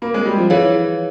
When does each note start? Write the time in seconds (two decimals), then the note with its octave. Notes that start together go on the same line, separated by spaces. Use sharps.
0.02 A#3
0.14 G#3
0.26 G3
0.38 F3
0.50 E3 E4 G#4 C#5 F5